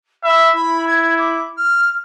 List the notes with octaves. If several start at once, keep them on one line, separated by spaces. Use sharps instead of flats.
E5 B5
E4 B5
G#6
D6
F6